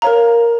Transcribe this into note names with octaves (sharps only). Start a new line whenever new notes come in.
A#4 C#5 F5 A#5